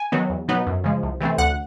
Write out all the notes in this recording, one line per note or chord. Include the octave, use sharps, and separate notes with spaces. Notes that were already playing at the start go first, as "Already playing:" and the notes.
Already playing: G#5
D#3 F#3 B3
E2
B2 F#3 B3 D#4
F#2
C#3 F3 G#3
C2
C3 E3 A3 C4
D2 F#5